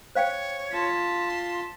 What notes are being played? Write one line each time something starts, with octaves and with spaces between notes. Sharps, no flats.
C5 C#5 F5 G5
F4 A5 B6
C6